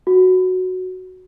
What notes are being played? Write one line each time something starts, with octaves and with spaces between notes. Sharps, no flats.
F#4